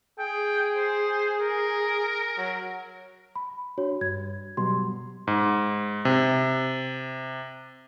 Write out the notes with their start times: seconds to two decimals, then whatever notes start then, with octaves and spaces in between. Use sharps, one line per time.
0.19 G#4 G5
0.76 C5
1.40 A#4
2.38 F#3
3.36 B5
3.78 D4 F#4 C#5
4.01 G2 G#6
4.57 B2 F#3 G3 C6
5.27 G#2
6.05 C3